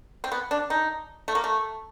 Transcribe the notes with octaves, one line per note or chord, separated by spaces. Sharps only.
C4
B3
D4
D#4
A3
A#3
A3